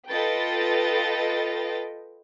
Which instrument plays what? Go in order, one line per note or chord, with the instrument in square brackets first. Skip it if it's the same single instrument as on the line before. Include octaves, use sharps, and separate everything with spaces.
[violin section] F4 A4 B4 D#5 G5 A6